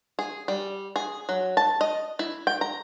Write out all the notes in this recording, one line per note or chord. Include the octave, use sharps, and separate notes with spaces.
G#4
G3
G#4
F#3
A5
D#5
E4
G5
A#5